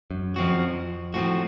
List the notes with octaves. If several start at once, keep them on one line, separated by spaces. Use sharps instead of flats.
F#2
F2 F3 C4 F#4
A2 F3 C4 F#4